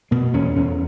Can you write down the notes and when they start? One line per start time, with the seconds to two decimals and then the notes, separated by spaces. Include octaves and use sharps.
0.11 B2 A#3
0.33 E2 C#4
0.56 E2 C#4